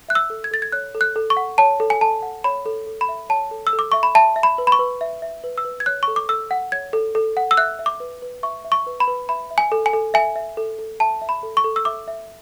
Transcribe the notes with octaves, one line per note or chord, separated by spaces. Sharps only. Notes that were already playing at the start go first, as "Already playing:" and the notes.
E5 F#6
E6
A4
G#6
A4 A6
G#6
C#5 F#6
A4
F#6
A4
C#6
F#5
C#5 A5
A4
G#5
A4 A5
F#5
C#5 B5
A4
A4
B5
E5
C#5 A5
A4
E6
A4
D6
E5 C#6
B5
E5 A5
E5
B5
B4
B5
C#6
B4
E5
E5
B4
E6
B4
G#6
C#5 F#6
C#6
A4
D6
A4 E6
F#5
C#5 G#6
A4
A4
F#5
E6
E5 F#6
E5
D6
B4
B4
E5 C#6
E5
C#6
B4
B5
B4
E5 B5
E5
G#5
A4
G#5
A4
E5 G#5
E5
A4
A4
E5 A5
E5
B5
A4
C#6
A4
E6
E5 D6
E5